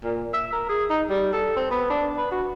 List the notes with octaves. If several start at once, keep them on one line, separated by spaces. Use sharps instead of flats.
A#2
E5
A#4
G#4
D#4
G3
A4
C4
B3
D4
B4
F#4